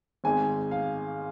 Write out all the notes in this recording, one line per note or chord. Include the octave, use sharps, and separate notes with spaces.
G#1 G#2 G#3 G#5
F5